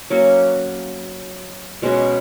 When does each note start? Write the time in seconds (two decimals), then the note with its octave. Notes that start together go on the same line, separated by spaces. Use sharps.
0.10 F#3 A#3 C#4 F#4
1.82 B2 G#3 C#4 F#4